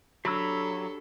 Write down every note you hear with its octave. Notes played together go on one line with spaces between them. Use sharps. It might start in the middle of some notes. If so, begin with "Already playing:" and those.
F#3 D4 G4 A4 B5 E6